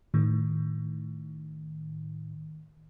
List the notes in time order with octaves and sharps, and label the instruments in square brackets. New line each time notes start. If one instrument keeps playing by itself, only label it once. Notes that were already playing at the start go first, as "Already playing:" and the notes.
[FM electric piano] A2 D#3